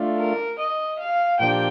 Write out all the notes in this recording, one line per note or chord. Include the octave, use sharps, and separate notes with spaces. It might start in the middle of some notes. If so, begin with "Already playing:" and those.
Already playing: A3 D4 F4
A#4
D#5
F5
A#2 F3 A#3 D4 G4 G5